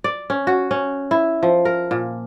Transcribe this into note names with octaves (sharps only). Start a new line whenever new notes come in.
D5
C#4
F#4
C#4
E4
F3
A#4
A#2